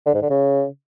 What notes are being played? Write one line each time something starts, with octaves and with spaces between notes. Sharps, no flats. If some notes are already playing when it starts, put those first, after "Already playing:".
D3
G#2
D3
C#3